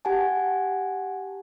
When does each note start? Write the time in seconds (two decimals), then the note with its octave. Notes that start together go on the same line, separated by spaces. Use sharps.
0.05 G4 F#5 G#5 A5